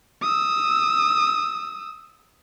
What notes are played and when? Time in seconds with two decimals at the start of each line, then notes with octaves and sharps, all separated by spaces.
0.22 D#6 E6